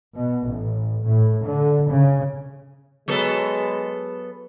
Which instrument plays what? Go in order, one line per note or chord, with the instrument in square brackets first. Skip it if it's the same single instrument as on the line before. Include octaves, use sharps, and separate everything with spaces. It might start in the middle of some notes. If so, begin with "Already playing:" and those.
[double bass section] B2
A1
A2
D3
C#3
[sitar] F#3 B3 A4 [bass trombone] G#3